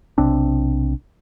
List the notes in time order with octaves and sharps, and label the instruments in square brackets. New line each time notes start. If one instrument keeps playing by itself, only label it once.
[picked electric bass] B1 C3 C4 D4